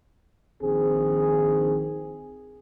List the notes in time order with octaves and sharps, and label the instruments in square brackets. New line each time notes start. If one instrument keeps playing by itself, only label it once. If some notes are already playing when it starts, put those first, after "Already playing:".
[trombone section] A#1 D#3 C4 G#4